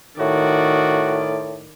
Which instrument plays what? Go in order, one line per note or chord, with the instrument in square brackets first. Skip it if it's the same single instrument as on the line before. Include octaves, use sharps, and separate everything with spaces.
[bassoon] A2 [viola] D#3 D5 [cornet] F#4